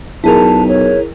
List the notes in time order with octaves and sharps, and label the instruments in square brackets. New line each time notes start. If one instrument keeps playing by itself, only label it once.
[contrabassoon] B1 [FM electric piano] E4 G#4 A#4 [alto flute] A5
[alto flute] C#5